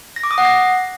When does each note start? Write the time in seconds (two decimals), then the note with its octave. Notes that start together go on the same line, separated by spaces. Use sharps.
0.16 A#6
0.23 D6
0.31 D#6
0.38 F#5
0.45 A#6